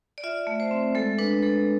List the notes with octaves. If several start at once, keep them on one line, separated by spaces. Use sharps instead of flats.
D5
F4 E5
A3
C5
C4
G#3 A4
D4 B4
G#3 A4